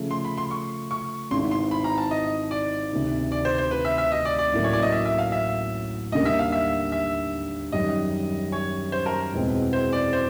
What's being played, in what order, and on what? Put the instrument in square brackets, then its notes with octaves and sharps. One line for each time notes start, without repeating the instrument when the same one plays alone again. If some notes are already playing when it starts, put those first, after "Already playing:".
Already playing: [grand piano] C#3 F3 A3
[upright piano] C6
B5
C6
C#6
C#6
[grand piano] G#1 G#2 E3 [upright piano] C6
[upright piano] C6
B5
A#5
A5
D#5
D5
[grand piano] D2 C3 D#3
[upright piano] D5
C5
C5
B4
E5
E5
D#5
D5
D5
[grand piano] A1 A2 F#3 A#3
[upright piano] C#5
D5
D#5
E5
E5
F5
E5
[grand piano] D#2 D3 G3 A#3 [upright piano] D#5
[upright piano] E5
F5
E5
E5
[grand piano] F#2 D#3 G3 [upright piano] D#5
[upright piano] C#5
C5
A#4
[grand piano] E2 B2 G#3 C4 E4
[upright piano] C5
D5
C5